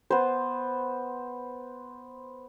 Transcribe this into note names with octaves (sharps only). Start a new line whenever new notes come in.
B3 C5